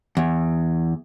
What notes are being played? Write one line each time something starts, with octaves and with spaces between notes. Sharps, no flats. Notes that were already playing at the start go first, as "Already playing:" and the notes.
E2